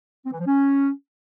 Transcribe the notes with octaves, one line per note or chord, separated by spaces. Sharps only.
C4
E3
F3
C#4